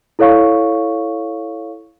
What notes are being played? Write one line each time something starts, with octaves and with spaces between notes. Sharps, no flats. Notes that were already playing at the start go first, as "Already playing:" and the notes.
E4 A4 C#5 F5 C#6